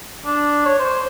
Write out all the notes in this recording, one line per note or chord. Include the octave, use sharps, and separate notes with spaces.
D4
C#5
C5